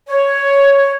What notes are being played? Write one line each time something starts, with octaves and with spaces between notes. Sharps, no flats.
C#5